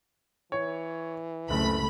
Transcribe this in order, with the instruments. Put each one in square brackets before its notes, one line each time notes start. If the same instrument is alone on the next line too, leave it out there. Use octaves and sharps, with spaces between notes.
[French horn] E3 [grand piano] C#5
[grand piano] F#1 [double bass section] C#2 C3 A3 [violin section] B5